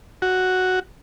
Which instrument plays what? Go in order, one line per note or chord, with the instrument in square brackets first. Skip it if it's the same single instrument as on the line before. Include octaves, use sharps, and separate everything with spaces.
[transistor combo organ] F#4